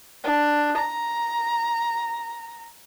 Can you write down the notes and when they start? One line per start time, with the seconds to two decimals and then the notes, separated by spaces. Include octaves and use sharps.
0.24 D4
0.78 A#5